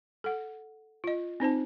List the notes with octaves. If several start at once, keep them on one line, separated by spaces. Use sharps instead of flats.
A4 F#5
F4 D#5
C4 D#4 C5 A5